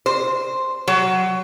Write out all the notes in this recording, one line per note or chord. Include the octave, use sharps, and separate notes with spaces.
C5
F#3